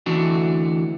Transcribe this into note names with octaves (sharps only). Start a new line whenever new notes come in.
D2 E3 D4 F#4